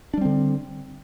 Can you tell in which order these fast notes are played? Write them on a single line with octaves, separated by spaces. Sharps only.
D4 G3 C4 D3